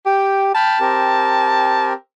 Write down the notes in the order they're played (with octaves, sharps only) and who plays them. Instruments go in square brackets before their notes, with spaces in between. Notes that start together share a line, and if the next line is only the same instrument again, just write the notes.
[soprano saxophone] G4 [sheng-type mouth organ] G5
[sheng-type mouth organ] G5 B5 F6 [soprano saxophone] A5
[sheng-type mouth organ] C4 G4 A#4